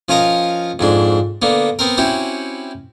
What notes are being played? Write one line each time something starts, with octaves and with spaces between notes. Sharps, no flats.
F3 C#4 F4 A#4 D#5
F2 G#2 D4
D3 A#3 B3
B3 C4 A#4
C4 C#4 E4 F#4 G4